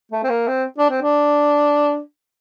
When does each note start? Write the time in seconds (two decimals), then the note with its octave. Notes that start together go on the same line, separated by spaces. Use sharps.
0.12 A3
0.24 C4
0.29 A#3
0.48 C4
0.78 D4
0.90 C4
1.02 D4